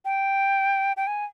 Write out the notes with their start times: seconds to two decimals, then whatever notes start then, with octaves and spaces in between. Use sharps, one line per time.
0.05 G5
0.97 G5
1.07 G#5